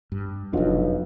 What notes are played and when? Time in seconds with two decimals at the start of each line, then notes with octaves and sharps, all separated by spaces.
0.12 G2
0.53 F1 B1 F2 D4 F4 F#4